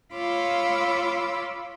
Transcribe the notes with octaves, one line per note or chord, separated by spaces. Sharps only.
F4 C#5 B5 C6 D6 E6